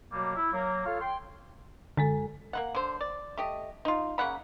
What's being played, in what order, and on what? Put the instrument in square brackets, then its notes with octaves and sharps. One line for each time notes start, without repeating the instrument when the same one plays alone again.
[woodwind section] B2 F#3 G3 A#3
E4
F#3 A#3
F4 A4 C#5 F5
G5 C6
[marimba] F#2 G#3 A4 [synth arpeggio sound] D3
[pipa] A#3 D#4 F#5
D3 C5
D5
A3 G4 D#5
D#4 F4
C#3 A#3 F#5 B5